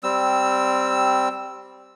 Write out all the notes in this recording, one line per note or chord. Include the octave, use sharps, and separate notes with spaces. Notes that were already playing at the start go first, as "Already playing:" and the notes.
G3 C4 E6